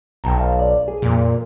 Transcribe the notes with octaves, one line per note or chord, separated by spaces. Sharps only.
B1 G5 A5 A#5
F5 A5
D5
G#4
F2 A#2